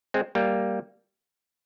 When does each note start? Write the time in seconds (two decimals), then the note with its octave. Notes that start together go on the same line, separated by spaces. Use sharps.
0.14 G#3 C4
0.35 G3 A#3